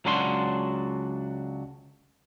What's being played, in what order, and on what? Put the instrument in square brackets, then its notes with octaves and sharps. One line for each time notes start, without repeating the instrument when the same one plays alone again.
[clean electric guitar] C#2 F#3 D4 F#4 E5 C6